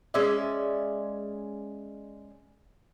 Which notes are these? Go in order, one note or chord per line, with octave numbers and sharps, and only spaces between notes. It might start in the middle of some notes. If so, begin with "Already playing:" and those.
G#3 C#4 D5 E5